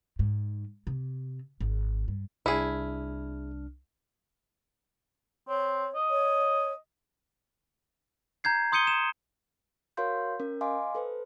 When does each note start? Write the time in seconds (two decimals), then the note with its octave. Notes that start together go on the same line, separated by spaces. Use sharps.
0.19 G#2
0.87 C3
1.60 G#1
2.08 G2
2.46 C2 D4 E4 G#4 F6
5.48 C4 C#5
5.95 D#5
6.10 C#5
8.44 A#5 G6 G#6 C7
8.72 C6 D#6 G6 C#7 D#7 G7
8.87 E7
9.97 F#4 A#4 C#5 F5 C6 G6
10.40 C#4 A#4
10.61 D#5 F5 G#5 C6 D6
10.95 A4 B4 C5